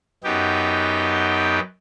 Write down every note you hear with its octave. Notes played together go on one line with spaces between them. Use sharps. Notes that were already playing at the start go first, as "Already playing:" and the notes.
F#2 B3 D#4 G4 G5